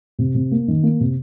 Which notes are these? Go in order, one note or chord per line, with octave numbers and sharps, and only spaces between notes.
C3
C3
A#3
D#3
A#3
C3